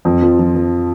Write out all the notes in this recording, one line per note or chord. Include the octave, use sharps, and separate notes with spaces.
F2
F3
F3
F3